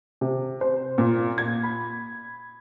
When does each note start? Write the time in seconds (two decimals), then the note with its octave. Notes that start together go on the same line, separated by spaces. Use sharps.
0.21 C3
0.61 C5
0.98 A#2
1.38 G#6
1.63 B5